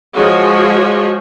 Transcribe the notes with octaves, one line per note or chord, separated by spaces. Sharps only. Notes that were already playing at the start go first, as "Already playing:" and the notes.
F3 G#3 F#4 G#4 C#5